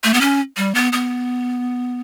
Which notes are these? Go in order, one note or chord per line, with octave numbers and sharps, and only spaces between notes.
A3
B3
C#4
G3
B3
B3